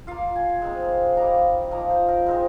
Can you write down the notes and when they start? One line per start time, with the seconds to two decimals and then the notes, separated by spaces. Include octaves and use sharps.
0.07 A#3 F4 F5
0.36 G#5
0.62 G#3 C4 D#4
1.17 G3 A#3 D#4 A#5
1.71 F3 A#3 D#4 A#5
1.90 C5
2.08 A#4
2.26 G#3 C4 D#4 A#4